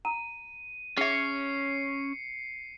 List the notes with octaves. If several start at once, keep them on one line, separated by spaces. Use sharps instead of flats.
A#5 D#7
C#4 G#4 C#5 E5 C7 C#7